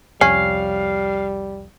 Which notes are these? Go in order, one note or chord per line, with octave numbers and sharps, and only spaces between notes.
C2 F2 G3 C#4 F5